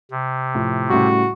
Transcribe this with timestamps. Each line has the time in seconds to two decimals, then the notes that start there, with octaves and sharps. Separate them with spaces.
0.11 C3
0.55 A2 F3
0.89 A2 C#3 G3 F#4